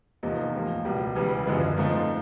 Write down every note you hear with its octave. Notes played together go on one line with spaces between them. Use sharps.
E2 C3 F3 A#3 D#4
A2 F3 A#3
C#2 B2 G3
C#2 C#3 E3 G3
F#2 D3 F3 G#3 B3
G#2 F3 A3 C4 D#4